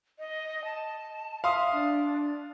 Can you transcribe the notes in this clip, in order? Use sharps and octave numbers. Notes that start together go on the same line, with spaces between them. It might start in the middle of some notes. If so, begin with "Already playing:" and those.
D#5
A5
E5 F5 C6 D#6
D4